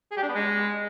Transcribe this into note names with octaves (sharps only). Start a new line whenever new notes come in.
G#4
G4
D4
B3
G#3